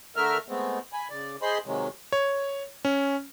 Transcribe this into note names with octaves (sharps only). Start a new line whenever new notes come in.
D3 A3 A#4 E5 F6
G#3 A3 B3 C4
G#5 B5
C#3 D5
G#4 C5 D#5 B5 C6
C3 D#3 F#3 G#3
C#5
C#4